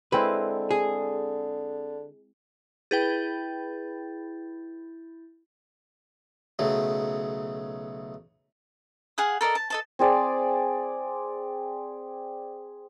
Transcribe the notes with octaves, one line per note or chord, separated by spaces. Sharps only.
D3 G#3 C4 E4 B4
G#4
E4 G#4 B4 G5 G6 A6
B1 C#3 F#3 A3
G#4 F5 F#5 D#6
A4 A#4 D5 D#5
A5
A4 D#5 A5
C4 G#4 D5